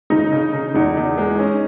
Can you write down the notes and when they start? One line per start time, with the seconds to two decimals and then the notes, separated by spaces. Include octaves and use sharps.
0.10 C#3 D#4
0.32 C#3
0.54 C#3
0.74 E2 D#4
0.97 E2
1.18 G#3
1.39 C#4